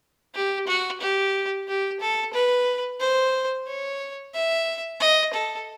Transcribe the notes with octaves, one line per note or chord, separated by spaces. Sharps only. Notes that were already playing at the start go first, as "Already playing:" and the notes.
G4
F#4
G4
G4
A4
B4
C5
C#5
E5
D#5
A4